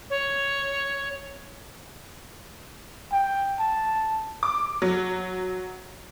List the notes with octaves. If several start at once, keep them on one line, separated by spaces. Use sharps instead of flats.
C#5
G5
A5
D6
F#3